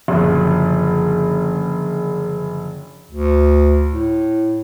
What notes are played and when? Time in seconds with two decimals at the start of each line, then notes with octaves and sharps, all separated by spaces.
0.08 F#1 D3 F3 F#4
3.11 D2
3.92 A2